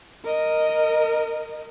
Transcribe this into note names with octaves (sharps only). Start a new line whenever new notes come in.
A#4 D#5